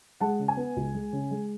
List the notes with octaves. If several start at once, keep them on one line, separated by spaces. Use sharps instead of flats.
G#3 F#5 A5
C#3
G#5
B3
C#2
G#3
C#3
G#3